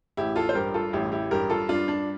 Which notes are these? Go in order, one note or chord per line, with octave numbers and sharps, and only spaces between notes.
A1 E4 G4
F4 A4
C5
G2 G4 A#4
F4 A4
A1 E4 G4
E4 G4
G2 G4 A#4
F4 A4
G2 D4 F4
D4